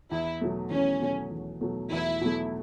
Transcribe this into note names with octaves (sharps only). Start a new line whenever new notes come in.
E2 E4
B2 F#3 A3
E2 C#4
B2 F#3 A3
E2
B2 F#3 A3
E2 E4
B2 F#3 A3